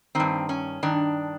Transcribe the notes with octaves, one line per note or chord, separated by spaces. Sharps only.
G2 D#3 C4
C#4
G2 D#3 D4